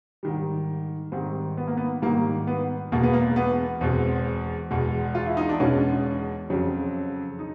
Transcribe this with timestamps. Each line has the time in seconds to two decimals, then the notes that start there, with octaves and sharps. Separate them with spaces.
0.23 G#2 D#3 G3
1.12 G#2 D#3 G3 C4
1.57 B3
1.68 A#3
1.77 B3
2.02 G#2 D#3 G3 A#3
2.47 B3
2.92 E2 B2 G#3 A#3
3.03 B3
3.13 A#3
3.36 B3
3.81 E2 B2 G#3 C4
4.71 E2 B2 G#3
5.15 F4
5.26 E4
5.37 D#4
5.49 D4
5.60 E2 B2 G#3 C#4
6.50 F2 C#3 F#3
7.39 D#4